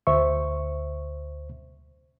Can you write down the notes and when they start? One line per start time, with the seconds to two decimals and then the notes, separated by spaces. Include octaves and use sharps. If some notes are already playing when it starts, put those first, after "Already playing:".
0.07 D2 C5 E5 C#6